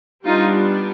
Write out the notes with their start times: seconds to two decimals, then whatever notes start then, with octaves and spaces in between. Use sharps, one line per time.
0.25 G3 B3 D4 D#4 F4